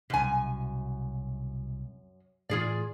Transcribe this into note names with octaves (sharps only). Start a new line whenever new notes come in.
C2 F#2 B2 G#5
A2 E3 A3 F4 G#4 D5